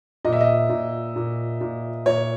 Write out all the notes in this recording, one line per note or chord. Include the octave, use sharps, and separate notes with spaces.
A#2 D#5
E5
D#5
A#2
A#2
A#2
A#2 C#5